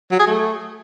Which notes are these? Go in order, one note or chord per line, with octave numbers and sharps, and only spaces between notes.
F#3
G#4
A3